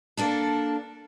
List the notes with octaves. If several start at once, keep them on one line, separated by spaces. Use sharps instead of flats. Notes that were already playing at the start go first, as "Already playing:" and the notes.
A#3 D4 A4